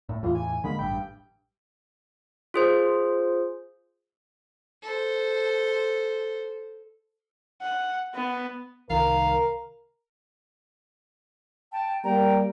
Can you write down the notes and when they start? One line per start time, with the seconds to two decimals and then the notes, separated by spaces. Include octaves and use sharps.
0.09 A2
0.23 E2 A2 E3 F4
0.35 G#5
0.64 D3 G#3 A#3 B5
0.79 A1 G2 G5
2.54 F4 G#4 C5
4.83 A4 C5
7.62 F#5
8.14 B3
8.90 C2 D#3 A#4 F5
11.72 G5 A5
12.03 G3 A#3 G5 A#5